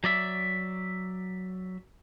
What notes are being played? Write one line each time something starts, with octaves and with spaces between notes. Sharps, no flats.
F#3 D5 E5